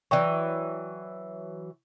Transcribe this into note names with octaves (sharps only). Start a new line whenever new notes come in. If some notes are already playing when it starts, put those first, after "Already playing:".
E3 F#3 D5 G5 C#6